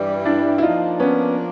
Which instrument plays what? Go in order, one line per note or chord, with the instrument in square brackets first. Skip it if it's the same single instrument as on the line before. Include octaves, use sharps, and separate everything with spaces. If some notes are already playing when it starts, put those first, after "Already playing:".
Already playing: [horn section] G2 E3 G3
[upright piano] D4 E4
E4
[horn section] F3 A#3 D4 [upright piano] D#4 F4
[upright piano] B3 C#4